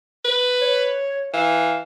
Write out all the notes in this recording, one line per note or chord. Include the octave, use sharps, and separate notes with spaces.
B4
C#5
E3 F5